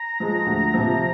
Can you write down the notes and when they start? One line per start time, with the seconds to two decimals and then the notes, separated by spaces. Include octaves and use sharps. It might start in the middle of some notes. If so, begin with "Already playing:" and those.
Already playing: A#5
0.20 F3 G#3
0.46 D2
0.74 C3 F3